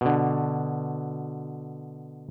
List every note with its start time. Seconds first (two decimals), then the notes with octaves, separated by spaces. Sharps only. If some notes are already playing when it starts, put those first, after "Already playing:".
0.01 B2 D3